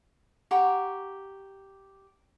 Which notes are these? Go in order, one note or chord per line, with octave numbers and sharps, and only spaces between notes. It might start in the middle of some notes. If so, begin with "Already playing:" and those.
G4 F#5 A#5 C#6